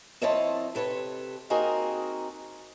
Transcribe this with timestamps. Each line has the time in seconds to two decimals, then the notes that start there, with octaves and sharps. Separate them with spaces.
0.21 F3 C4 E4 C#5 D#5 A5
0.75 C3 A4 B4 C#5
1.50 A#3 C4 D#4 F#4 G#4 A#4